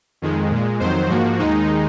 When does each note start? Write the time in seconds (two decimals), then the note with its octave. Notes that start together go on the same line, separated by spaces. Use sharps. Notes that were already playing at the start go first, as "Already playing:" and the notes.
0.22 F2 D#3 G#3
0.51 A#2 G#3
0.80 F2 D#3 F#3 C5
1.10 G#2 F3 A#3 F#4
1.39 D#2 D#3 G#3 D#4